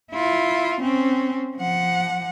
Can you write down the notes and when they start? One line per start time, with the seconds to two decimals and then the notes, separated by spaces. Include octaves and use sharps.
0.12 E4 F4
0.81 C4 C#4
1.56 F3 F#5